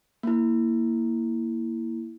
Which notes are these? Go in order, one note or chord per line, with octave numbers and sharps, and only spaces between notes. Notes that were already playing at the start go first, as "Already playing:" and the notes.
A#3 E4